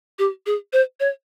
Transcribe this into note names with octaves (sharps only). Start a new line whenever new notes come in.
G4
G#4
C5
C#5